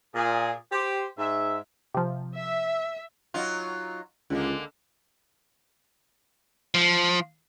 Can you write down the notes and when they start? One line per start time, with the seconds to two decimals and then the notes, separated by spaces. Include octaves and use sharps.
0.15 A#2 G#4
0.72 G4 C5
1.18 G#2 E5
1.94 C3 F3
2.34 E5
3.34 F#3 D#4 F4
4.30 C#2 D3 G#3 A#3
6.74 F3